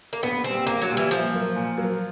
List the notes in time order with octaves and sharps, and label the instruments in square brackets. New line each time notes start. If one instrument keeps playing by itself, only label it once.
[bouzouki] A#3
[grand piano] A#1 [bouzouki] B3
[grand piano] A#2 G3 [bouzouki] C4
[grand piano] A#1 [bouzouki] A#3
[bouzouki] F#3
[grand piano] A#2 G3
[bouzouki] E3
[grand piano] A#2 [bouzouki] F3
[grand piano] F#3 A#3
A#2
F#3 A#3